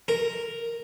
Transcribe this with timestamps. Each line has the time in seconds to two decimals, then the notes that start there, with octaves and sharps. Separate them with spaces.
0.08 A#4